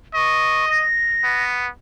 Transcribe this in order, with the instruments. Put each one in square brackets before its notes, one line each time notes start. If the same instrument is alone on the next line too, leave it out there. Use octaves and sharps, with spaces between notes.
[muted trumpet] D#5 [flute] C#6
[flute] A#6
[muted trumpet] B3